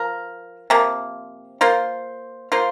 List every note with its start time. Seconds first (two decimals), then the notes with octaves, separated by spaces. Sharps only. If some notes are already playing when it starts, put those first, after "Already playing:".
Already playing: F3 A#4
0.70 C3 F3 A#3
1.61 A#3 F4 C5
2.52 A#3 F4 C5